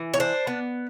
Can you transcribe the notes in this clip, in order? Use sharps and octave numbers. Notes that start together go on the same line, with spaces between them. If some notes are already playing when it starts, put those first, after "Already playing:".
Already playing: E3
C#5
D4 C5
B3